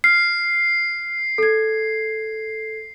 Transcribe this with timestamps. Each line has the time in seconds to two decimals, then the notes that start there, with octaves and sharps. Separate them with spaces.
0.04 F6 C7
1.38 A4 G#6